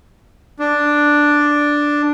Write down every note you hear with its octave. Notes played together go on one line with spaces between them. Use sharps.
D4